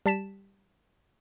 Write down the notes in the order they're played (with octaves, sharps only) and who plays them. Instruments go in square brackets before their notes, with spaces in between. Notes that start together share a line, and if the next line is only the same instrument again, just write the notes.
[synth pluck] G3 A5 B6 E7